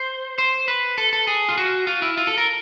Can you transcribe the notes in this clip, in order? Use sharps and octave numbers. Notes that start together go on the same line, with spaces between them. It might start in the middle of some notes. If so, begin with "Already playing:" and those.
Already playing: C5
C5
B4
A4
A4
G#4
F4
F#4
F4
E4
F4
A4
A#4